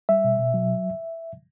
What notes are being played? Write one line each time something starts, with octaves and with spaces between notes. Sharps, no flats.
G3 E5
B2
B2
F#3